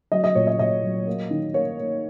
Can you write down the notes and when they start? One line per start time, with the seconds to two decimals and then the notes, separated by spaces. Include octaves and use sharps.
0.12 F#3 D#5
0.24 D#5
0.35 A#2 C#5
0.47 D#5
0.59 A#2 D#5
0.83 F#3
1.07 A#3
1.30 D#3
1.54 A#3 C#5
1.78 A#3